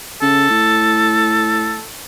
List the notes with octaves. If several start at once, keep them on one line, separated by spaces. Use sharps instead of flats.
C#3 A4
A2